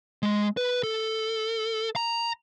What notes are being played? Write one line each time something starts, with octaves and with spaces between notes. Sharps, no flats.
G#3
B4
A4
A#5